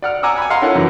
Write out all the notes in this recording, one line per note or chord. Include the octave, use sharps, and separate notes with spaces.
D5 F#5 F6
F#5 G#5 A#5 D6 E6
G#5 B5
D#5 F5 F#5 A#5 C6
C#4 E4 F4 A4 A#4 F#5
F#2 E3